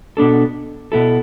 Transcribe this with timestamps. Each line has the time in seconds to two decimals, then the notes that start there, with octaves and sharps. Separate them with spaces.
0.17 B2 B3 D4 A4
0.92 B2 B3 E4 A4